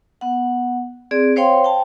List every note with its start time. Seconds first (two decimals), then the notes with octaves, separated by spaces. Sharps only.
0.21 B3 F#5
1.11 C4 G#4 D5
1.36 C5 C#5 F5 G5 C6
1.64 G5 A5